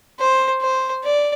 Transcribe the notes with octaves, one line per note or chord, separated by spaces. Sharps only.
C5
C5
D5